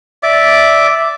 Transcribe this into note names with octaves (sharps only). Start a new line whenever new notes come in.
D5 E5 D6